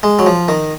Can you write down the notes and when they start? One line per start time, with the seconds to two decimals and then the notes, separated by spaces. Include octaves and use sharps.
0.03 G#3
0.19 F#3
0.26 F3
0.48 D#3